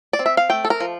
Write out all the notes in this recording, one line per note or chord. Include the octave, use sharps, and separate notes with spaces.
D5
C4
E5
F5
A3 G5
A4
A#4
F3